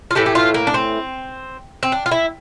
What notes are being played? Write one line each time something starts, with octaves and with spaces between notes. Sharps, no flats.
F4
A2 E3 A3 G4
G4
F4
A#3
D4
C4
C4
D4
F4
E4